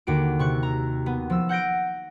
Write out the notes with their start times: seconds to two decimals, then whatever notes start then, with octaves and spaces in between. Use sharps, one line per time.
0.07 D#2 D3 F#4 D7
0.39 C3 C#6 F#6
0.63 A#5
1.06 B3
1.30 F3 E6
1.49 F#5 G6 A#6 D7